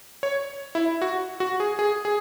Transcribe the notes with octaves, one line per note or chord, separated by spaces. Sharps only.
C#5
E4
F#4
F#4
G#4
G#4
G#4